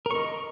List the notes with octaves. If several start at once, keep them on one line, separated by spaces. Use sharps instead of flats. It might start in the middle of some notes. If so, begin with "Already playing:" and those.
A#4 D#5 C#6